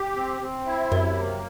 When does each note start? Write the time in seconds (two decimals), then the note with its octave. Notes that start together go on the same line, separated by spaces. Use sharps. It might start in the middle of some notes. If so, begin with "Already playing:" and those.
Already playing: G4
0.16 C4
0.41 C4
0.66 E4
0.92 F#2 C3
1.17 A#3